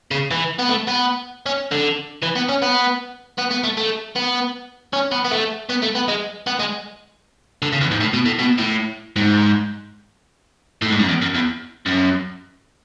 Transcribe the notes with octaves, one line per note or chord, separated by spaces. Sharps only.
C#3
E3
B3
A3
B3
C#4
D3
E3
B3
C#4
B3
B3
B3
A3
A3
B3
C#4
B3
B3
A3
B3
A3
B3
G#3
B3
G#3
D3
C#3
E2
G#2
A2
B2
A2
B2
A2
G#2
A2
G#2
F#2
E2
F#2
E2
F#2